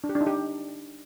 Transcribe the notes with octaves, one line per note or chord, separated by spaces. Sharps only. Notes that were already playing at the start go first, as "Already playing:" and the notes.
D4
G4
D4
D#4
G4